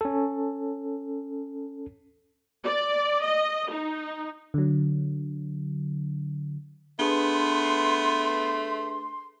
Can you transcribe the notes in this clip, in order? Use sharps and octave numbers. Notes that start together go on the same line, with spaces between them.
C#4 A4
D5
D#5
D#4
D3 F#3
A3 B3 D4 G#4 B4 C6